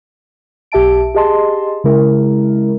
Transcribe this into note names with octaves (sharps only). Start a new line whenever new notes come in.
B1 G4 E5 A5 D7
G4 G#4 D#5 A5 C6
C#3 G#3 E4 A#4